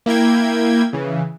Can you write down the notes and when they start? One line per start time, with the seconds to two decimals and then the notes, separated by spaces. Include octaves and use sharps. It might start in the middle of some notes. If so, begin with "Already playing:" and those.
0.06 A#3 E4 G5 G#6
0.93 C#3 E3